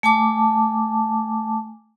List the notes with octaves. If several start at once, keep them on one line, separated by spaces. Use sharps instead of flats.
A3 G#5 A5 D6